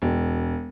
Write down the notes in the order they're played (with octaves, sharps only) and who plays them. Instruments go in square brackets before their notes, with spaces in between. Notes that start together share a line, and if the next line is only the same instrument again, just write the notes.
[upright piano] E1